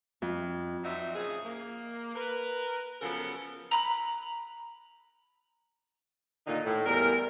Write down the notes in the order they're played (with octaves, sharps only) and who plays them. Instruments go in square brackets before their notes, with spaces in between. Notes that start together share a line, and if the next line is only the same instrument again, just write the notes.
[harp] F2
[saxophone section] F#3 C4 D4 D#4 E5
A#2 C#3 F3 D#4 G#4
A#3
A#4 B4
C#3 F3 F#3 B3 A4 A#4
[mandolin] A#5 B5 F#6
[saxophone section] A#2 D3 D#3 D#4
A2
E2 G3 A#4